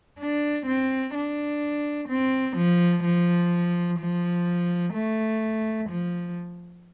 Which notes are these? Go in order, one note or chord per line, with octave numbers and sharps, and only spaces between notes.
D4
C4
D4
C4
F3
F3
F3
A3
F3